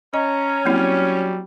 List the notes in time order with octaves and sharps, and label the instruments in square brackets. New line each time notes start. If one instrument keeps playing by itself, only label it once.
[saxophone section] C#4 [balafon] D#5 [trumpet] A#5
[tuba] F#3 [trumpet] G3 [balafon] A#3 C4 E4